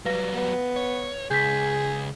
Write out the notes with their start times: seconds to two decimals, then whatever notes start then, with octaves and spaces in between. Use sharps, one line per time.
0.05 F#3 G3 B4 F5 A#6
0.34 B3
0.76 C#5
1.31 C#2 G#4 G6 B6